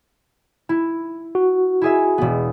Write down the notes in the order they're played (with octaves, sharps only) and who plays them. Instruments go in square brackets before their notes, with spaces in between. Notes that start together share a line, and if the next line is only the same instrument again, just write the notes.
[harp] E4
[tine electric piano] F#4
[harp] E4 G#4 E5
E1 B3